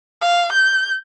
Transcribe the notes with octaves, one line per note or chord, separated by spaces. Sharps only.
F5
G6